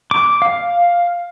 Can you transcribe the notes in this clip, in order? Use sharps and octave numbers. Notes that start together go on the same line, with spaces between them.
D6
F5